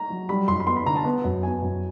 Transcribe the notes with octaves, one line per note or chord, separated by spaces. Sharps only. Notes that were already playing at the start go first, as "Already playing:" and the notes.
Already playing: A#5
F#3
G3 B5
F#2 C6
B5
B3 C6
B5
D3 A#5
A5
B3
F#2
B3 G#5
F#2